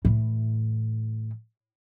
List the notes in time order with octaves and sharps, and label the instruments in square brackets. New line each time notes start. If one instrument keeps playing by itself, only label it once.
[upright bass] A2 E3